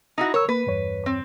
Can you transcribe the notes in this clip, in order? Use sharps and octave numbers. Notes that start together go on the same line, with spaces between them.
D#4 E4 F#4
A#4 C#5 E6
A#3 B4
E2 G2 C#5
C4